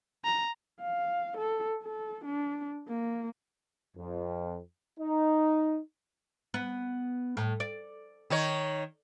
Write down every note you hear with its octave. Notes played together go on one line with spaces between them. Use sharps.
A#5
F5
A4
A4
D4
A#3
F2
D#4
B3
A2
D5
D#3 D#4 C#5